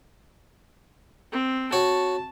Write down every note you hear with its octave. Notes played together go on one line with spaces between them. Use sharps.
C4
F#4 C#5 A5